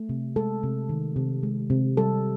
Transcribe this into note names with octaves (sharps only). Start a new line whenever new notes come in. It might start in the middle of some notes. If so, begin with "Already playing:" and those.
Already playing: A3
C3
G#3 A4
C3
D#3
C3
G#3
C3
G3 A4